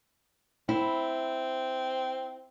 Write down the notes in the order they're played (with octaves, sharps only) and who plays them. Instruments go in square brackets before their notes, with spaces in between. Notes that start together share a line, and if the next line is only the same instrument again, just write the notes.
[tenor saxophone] C4 [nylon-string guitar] E4